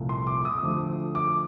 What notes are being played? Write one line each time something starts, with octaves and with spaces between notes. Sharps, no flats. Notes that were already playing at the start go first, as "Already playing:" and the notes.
Already playing: C2 A#2 F3 A3
C6
D6
D#6
D2 D3 F3 A3
D6